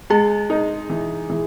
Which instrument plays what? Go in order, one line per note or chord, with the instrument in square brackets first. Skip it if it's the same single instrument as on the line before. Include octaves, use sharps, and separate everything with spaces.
[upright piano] G#3 [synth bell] G#4
[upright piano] D#4
E3
E3